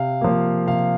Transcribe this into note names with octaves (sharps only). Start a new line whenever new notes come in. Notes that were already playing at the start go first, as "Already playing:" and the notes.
Already playing: C3 F5
F3 A#3
C3 F5